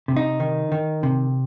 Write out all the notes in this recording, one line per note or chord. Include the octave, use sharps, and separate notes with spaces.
C3
D#4
D#3
D#3
C3